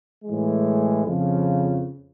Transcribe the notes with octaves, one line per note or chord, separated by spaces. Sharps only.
A2 E3 G#3
F2 C#3 F3